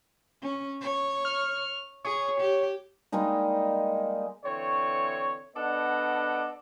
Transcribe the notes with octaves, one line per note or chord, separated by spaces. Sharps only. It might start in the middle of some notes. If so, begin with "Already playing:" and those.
C#4
C#5
F6
G#4 C#5
G4
G3 G#3 A#3 D#4
D3 E3 C4 C#5
B3 D4 A4 D5 D#5 F#5